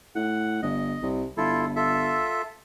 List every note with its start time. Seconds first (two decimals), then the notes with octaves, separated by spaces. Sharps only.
0.15 A2 F#5
0.62 G1 D#5
1.02 C2
1.37 G1 E4 F4 A4
1.76 F4 A4 E5